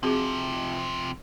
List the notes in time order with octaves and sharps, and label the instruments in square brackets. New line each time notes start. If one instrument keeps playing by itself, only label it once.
[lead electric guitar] C3 F3 [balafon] C4 F#4 G#4